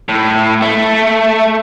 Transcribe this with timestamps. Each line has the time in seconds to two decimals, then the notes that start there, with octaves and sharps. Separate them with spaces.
0.09 A2
0.62 A3